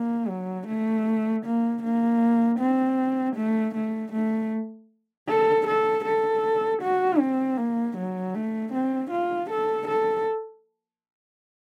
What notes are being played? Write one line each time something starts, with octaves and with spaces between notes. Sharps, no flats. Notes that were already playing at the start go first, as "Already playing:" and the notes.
Already playing: A#3
F#3
A3
A#3
A#3
C4
A3
A3
A3
A4
A4
A4
F#4
C4
A#3
F#3
A3
C4
F4
A4
A4